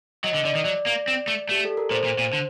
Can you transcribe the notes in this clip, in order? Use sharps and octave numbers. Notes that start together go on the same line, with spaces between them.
F#3 D#5
D3
D3 D5
D#3
F#3 D5
A#3
C4
A3
A3 G4
A4
A#4
A#2 C5
A#2
A#2
D3